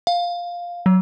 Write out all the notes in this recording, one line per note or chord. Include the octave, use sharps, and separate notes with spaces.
F5
F#3